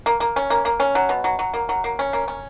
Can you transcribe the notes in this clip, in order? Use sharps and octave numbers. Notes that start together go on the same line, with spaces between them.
A#3
A#3
C#4
A#3
A#3
C#4
F#3
B2
F#3
F#3
A#3
F#3
A#3
C#4
A#3
C#4